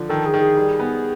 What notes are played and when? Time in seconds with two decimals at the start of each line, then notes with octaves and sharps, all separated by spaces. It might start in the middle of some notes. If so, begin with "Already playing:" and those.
Already playing: D3 F3
0.09 D#3 A4
0.26 G#4
0.34 D#3
0.41 G#4
0.56 G3
0.80 B3